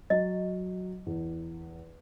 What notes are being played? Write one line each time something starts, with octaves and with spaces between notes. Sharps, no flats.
F#3 D#5
E2